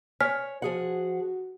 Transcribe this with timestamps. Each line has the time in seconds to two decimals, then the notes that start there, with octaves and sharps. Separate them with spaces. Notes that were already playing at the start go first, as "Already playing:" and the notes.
0.20 C#5 G#5 F6 B6
0.62 F3 F#4 G#4 F#5